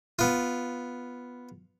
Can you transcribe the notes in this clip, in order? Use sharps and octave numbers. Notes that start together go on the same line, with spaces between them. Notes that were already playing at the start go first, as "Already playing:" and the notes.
B3 F4